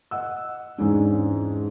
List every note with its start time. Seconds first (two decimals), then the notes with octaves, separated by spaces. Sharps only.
0.11 D#5 F#5 E6
0.78 E2 G#2 C#4 D4